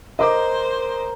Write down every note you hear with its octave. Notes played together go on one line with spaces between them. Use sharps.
A#4 C5 D#5 D6